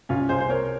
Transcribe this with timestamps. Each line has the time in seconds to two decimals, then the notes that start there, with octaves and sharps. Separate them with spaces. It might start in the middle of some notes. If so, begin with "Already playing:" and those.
0.09 C2 C#4 F4
0.29 C2 G#4 C5
0.40 C5
0.49 C3 A#4 C#5